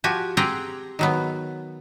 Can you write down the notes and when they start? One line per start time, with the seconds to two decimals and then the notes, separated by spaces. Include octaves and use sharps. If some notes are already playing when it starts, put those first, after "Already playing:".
0.04 F3 F#4 G4 G#5
0.37 C4 G4 G#4 F#5 G5 A#5
0.99 D#3 F#3 B3